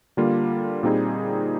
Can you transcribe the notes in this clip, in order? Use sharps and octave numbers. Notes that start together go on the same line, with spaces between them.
D3 G3 A#3 F4
A#2 G3 C4 D#4 G#4